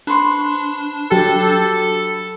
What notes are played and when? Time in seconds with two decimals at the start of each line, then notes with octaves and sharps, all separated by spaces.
0.07 D4 B4 C5 C#6
1.11 F#3 G4 A4